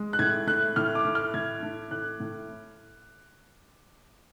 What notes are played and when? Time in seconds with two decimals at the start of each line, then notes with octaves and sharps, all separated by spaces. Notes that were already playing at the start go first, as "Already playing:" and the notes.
Already playing: G#3
0.13 F#6
0.19 A2 G#6
0.47 A3 F#6
0.76 A2 F6
0.95 D6
1.05 A3
1.15 F6
1.34 A2 G#6
1.63 A3
1.91 A2 F#6
2.20 A2